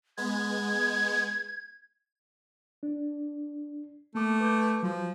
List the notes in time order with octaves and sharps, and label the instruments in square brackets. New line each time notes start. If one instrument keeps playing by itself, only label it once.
[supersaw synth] G#3 B3 [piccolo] G#6
[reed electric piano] D4
[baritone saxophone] A3 [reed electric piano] A#3 D6
[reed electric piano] B4 D6 G6
[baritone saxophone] F3 [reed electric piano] F#3